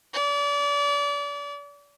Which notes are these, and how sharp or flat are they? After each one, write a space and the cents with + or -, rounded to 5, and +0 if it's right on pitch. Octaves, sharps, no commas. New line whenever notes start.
D5 -35